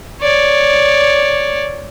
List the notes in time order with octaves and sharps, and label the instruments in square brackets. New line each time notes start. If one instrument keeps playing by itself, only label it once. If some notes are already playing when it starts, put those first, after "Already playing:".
[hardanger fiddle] C#5 D5